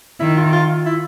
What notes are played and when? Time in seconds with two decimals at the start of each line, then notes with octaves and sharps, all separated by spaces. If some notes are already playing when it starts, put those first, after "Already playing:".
0.20 D#3 E4
0.37 F4
0.53 F4
0.86 E4